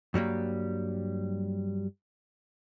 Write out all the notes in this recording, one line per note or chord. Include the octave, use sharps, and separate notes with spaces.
G2 F#3 G3 A#3